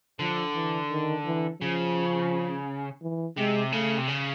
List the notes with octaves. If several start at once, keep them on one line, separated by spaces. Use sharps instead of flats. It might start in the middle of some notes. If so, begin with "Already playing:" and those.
D3 F3
E3
D#3
E3
C#3 F3
E3
C3 G#3
C#3 A3
C3
C#3